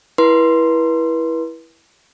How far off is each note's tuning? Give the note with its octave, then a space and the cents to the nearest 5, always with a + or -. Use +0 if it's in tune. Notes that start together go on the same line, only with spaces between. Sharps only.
E4 +0 B4 -35 C6 +0